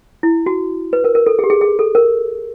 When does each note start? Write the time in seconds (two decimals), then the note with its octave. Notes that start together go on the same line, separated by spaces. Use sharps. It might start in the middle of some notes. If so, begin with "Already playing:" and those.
0.23 E4
0.46 F#4
0.93 B4
1.04 A#4
1.15 A#4
1.27 A4
1.39 G#4
1.44 G4
1.50 G#4
1.61 G#4
1.79 A4
1.95 A#4